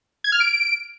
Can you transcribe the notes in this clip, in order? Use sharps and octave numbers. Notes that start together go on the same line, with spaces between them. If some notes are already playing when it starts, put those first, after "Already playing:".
G#6
F6
D7